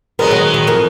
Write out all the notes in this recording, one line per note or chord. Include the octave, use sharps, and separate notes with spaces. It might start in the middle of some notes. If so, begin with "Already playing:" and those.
F#3 G#3 B3 A#4
D#3
D#3
F2 E3 A#4